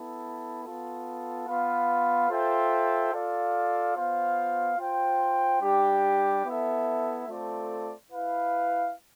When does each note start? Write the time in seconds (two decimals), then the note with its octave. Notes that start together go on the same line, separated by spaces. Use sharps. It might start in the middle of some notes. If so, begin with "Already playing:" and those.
Already playing: B3 E4 A4
0.63 B3 F4 A4
1.47 B3 F4 B4 F5
2.29 F4 A4 C5 E5 G5
3.13 F4 A4 D5 F5
3.96 B3 F4 C5 F5
4.78 F4 C5 G5
5.61 G3 D4 G4
6.44 B3 E4 A4 E5
7.28 A3 C4 F4 A4 D5
8.10 E4 B4 F5